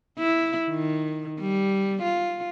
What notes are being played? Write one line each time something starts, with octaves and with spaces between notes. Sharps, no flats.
E4
D#3
G3
F4